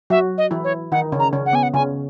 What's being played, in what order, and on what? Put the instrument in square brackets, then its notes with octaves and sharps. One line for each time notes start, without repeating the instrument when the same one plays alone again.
[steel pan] F#3 F#4 [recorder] E5
[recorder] D#5
[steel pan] E3 E4
[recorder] C#5
[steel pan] D#3 D#4 [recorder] F#5
[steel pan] C#3 C#4
[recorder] A#5
[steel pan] C#3 C#4
[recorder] F#5
[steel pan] B3 [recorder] G#5
[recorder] F#5
[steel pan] C#3 C#4 [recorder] G#5